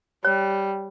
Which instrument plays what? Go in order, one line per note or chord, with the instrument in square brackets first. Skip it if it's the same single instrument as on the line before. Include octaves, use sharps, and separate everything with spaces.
[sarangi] G3 [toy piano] C#5